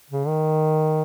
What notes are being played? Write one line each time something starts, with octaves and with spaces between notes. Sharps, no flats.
C#3
D#3